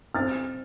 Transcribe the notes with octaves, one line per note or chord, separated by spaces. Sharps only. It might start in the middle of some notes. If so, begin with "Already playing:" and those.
C4 F6 A6